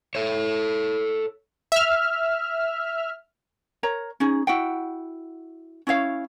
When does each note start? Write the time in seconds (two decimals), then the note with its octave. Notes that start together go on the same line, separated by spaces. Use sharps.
0.15 A4 C#5
1.72 E5 F6
3.83 A#4 C#5 A#5
4.20 C#4 D#4 G#4
4.47 E4 F#4 F#5 G5
5.87 C#4 E4 C#5 F5